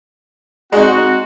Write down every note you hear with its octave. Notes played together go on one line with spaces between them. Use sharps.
G#3 C4 D#4 F#4